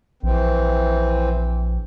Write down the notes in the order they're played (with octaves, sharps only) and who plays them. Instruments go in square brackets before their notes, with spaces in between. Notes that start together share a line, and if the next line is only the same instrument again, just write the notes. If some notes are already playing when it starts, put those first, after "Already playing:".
[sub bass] A#1 [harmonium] E3 C4